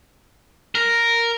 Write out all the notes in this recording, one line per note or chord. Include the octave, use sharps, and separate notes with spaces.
A#4